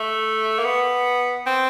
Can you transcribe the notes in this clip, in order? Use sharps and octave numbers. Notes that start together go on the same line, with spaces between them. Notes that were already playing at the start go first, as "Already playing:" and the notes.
Already playing: A3
A#3
B3
C4